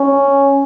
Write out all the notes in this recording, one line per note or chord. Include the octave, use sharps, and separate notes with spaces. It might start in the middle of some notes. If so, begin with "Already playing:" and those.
Already playing: C#4